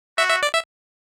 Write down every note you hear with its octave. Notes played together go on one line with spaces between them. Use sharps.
F#4 E5
E5
D5
E5